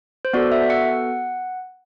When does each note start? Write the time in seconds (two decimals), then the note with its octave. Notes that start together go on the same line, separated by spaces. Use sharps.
0.25 C5
0.33 B3 F#4 A4 D5
0.52 E5
0.70 F#5